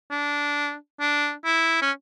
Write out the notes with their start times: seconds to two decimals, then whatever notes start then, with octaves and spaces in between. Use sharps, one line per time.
0.11 D4
1.01 D4
1.45 E4
1.82 C#4